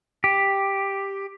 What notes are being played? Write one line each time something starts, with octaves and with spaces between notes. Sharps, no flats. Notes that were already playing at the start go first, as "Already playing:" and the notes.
G4